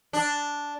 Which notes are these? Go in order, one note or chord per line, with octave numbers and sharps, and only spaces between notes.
D4